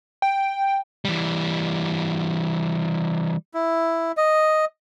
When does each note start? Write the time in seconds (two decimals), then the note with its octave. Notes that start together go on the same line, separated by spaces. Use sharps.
0.22 G5
1.05 E3 G3
3.54 E4
4.17 D#5